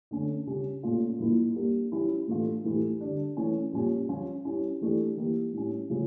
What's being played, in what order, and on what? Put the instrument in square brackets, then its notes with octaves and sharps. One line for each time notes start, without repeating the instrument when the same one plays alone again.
[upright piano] D3 A3 C#4
C#3 G3 C#4 G4
A#2 A3 C#4 F4
A#2 F3 A#3 E4
G3 A#3 D4
F3 C#4 E4 G4
A2 E3 A3 D4 F4
A2 E3 A3 E4 G4
D3 G3 D4
E3 A3 C#4
A#2 F3 C#4 G4
F3 C#4 F4
G3 C#4 E4
E3 A3 D4 G4
E3 A#3 E4 G4
A2 G3 C#4
C#3 F3 A3